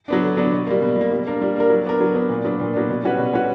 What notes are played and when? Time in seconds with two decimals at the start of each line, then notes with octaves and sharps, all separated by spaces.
0.08 F#3 B3 D4
0.23 D3
0.37 F#3 B3 D4
0.52 B2
0.66 G3 A#3
0.82 B2
0.96 G3 A#3
1.11 G3
1.26 A#3 D4 A#4
1.42 G3
1.56 A#3 D4 A#4
1.70 F#3
1.85 B3 D4 A#4
2.00 F#3
2.15 B3 D4 A#4
2.29 A#2
2.45 F#3 B3 D4
2.60 A#2
2.74 F#3 B3 D4
2.89 B2
3.03 G3 C#4 F#4 B4
3.18 B2
3.33 G3 C#4 F#4 B4